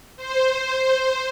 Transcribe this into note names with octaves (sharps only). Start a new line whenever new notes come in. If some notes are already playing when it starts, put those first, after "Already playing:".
C5